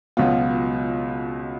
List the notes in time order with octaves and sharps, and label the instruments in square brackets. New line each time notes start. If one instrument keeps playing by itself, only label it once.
[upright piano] C#2 B2 F#3 B3 F4